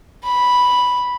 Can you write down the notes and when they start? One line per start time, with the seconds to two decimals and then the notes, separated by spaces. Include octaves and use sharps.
0.25 B5